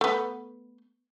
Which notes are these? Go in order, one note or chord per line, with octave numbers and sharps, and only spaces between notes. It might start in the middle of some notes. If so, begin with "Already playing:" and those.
A3 B3